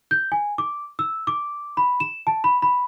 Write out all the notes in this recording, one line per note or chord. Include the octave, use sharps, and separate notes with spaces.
G6
G#5
D6
E6
D6
B5
E7
A5
B5
B5